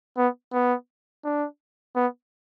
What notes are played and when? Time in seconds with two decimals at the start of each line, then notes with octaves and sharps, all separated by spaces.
0.17 B3
0.52 B3
1.24 D4
1.96 B3